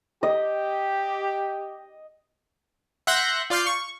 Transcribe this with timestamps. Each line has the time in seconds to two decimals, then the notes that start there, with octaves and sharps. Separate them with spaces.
0.23 G4 D#5
3.07 E5 F#5 C6 F#6 G6 A#6
3.50 F4 D5 C6 F6 G6 C7
3.67 C#6